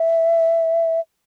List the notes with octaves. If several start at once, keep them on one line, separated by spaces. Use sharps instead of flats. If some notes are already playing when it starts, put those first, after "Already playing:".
Already playing: E5